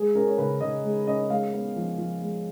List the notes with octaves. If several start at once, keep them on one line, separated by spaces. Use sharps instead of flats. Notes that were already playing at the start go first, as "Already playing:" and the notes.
Already playing: G#3 G#4
C#4 A#4
C#5
C#3 B4
C#3 D#5
G#3
C#4 D#5
G#3 F5
B3
F3
F3
G#3